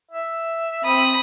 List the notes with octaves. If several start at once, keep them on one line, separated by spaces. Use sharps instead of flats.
E5
C4 B5 D#6